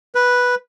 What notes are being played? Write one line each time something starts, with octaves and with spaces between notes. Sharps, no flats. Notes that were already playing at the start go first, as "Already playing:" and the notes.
B4